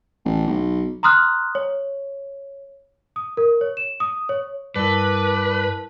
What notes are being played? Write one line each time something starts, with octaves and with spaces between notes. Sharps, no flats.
A1
B1
A#5 C6 D#6 F6 F#6
C#5
D#6
A#4
C#5
E7
D#6
C#5
G2 E4 A#4 B4 D5 A5